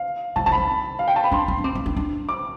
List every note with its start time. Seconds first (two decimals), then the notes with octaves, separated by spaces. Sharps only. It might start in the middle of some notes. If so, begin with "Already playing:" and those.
Already playing: F5
0.36 E3 A5
0.46 D3 A5
0.52 B5
0.57 C4
0.99 F5
1.08 G5
1.16 A5
1.24 B5
1.32 D4 C6
1.48 C4
1.58 D4
1.64 C4 D6
1.75 C4
1.86 D4
1.97 D4
2.29 D6